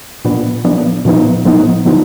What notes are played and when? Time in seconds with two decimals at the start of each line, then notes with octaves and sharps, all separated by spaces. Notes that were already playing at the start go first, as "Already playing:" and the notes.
0.25 A#2 F3 B3 D4
0.65 A#2 F3 B3 D4
1.05 A#2 F3 B3 D#4
1.45 A#2 F3 B3 D#4
1.85 D3 F3 B3 D#4